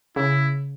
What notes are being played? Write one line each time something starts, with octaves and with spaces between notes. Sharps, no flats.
C#3 E4